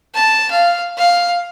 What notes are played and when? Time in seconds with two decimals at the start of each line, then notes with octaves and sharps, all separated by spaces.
0.14 A5
0.51 F5
0.98 F5